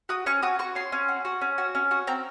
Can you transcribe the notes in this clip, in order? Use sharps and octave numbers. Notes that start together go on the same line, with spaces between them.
F#4 D#6
C#4 C#6
F#4 D#6
F#4 C#6
C#4 C6
C#4
F#4
F#4
C#4
F#4
C#4
F#4
C4 A#5